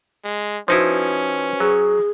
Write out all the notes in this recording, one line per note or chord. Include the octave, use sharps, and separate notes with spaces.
G#3
F3 C#4 D#4 E4 F#4 B4 C5
F#3 G#4